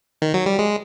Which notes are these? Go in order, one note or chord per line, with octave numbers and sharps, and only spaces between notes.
D#3
F#3
G3
G#3